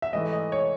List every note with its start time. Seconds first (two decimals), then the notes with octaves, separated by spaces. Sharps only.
0.02 E5
0.13 G#2 E3 A3 D#5
0.33 D#5
0.52 C#5